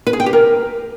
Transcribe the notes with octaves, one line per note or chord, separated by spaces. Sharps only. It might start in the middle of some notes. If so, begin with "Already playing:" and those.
B4
G#4
G5
G4
A#4